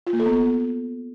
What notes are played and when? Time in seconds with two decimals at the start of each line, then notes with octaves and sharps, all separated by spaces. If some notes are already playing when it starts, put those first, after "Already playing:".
0.07 F4
0.13 A#3
0.20 A4
0.26 B3